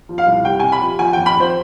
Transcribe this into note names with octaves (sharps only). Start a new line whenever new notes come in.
F3
F5
C2
C3 G5
C3 G#5
B5
F3
F3 G#5
G5
F2
B5
F2 C5